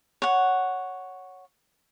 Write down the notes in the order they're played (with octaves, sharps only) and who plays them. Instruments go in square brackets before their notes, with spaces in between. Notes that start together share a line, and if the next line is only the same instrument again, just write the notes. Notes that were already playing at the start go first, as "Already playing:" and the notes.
[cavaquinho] C#5 F#5